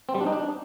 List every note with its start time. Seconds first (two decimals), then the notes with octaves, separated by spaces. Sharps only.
0.09 C4
0.15 G3
0.21 D4
0.26 D#4
0.32 D4